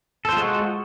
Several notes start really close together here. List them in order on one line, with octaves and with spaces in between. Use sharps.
A4 C5 F4 G#3 F#4